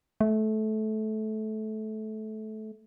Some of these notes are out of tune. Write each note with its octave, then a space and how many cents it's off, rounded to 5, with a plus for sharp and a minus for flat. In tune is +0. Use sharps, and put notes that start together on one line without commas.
A3 -20